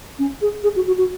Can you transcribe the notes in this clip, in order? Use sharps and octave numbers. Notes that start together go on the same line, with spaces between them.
C#4
G#4
G#4
F#4
F#4
F#4